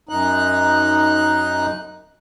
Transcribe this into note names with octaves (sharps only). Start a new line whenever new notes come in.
F#2 D#4 F#6